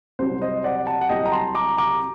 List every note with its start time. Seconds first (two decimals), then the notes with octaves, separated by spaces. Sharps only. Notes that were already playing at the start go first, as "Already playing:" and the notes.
0.19 C2 C3 F#3 C5
0.42 C5 D#5
0.64 D5 F#5
0.86 F#5 A5
1.01 F#5
1.09 C2 C3 F#3 D#5 G5
1.26 A#5
1.32 A5 C6
1.55 A#5 D6
1.77 A#5 D6